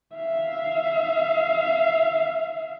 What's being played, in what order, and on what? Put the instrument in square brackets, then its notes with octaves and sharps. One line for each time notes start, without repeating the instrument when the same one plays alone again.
[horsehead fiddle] E5 F5